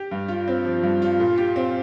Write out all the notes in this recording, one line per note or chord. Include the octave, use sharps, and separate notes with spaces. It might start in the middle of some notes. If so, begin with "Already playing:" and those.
Already playing: G4
G2
F4
C4
F3
G2
F4
A#2
G4
C4